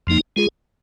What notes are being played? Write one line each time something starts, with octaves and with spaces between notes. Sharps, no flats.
F2 F3 A#3 D#4
G#3 F4 G#4